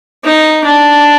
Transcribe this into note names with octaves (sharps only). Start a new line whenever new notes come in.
D#4
D4